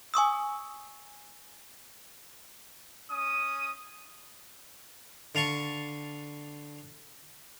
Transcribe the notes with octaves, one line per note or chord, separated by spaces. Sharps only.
G#5 C#6 D#6 E6
C#4 D#6
D3 F5 A5 C#6